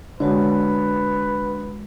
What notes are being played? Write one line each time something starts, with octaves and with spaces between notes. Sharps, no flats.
D3 G#3 F#4 B4 C#5